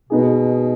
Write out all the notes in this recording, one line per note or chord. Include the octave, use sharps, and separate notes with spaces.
B2 B3 D#4 G#4